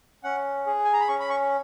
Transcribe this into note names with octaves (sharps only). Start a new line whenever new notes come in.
C#4 F#5
G#4
G#5
A#5
B5
C#4 C#6
B5
C#6